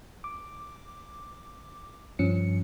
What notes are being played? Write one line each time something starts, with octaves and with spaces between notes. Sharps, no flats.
D6
G2 F3 C#4 C#7